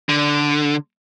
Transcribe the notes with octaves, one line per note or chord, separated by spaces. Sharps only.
D3